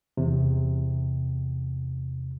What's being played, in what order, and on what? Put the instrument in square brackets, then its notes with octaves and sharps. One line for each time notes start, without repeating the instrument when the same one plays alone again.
[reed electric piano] E2 C3